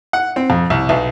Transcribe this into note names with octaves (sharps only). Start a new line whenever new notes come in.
F#5
C4
F2
C2
B1